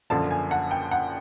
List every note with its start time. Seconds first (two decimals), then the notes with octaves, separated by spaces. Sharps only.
0.10 F#1 F#2 D3 F3 A5
0.31 G#5
0.51 F#5
0.71 G5
0.91 F#5